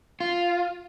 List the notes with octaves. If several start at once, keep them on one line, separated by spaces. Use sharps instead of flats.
F4